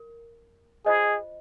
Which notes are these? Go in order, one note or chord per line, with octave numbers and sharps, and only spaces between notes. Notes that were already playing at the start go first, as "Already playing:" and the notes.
Already playing: A#4
F4 G#4 C5 D#5